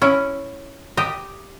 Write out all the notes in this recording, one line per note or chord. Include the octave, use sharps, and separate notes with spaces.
C#4 E4
G4 D#5